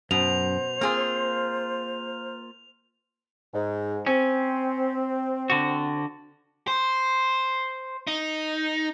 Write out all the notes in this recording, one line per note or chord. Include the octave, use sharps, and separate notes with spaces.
F#2 B2 C5 F7
A#3 C4 F4 G#4
G#2
C4 C#4
D3 F#4
C5
D#4